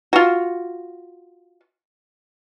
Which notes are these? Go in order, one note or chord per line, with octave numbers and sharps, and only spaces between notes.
F4 F#4